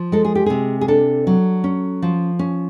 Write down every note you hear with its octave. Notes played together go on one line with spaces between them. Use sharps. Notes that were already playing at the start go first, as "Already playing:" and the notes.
Already playing: F3
G#3 A4
G#4
G4
C3 G#4
G#4
D4 A4
F#3
C#4
F3
C#4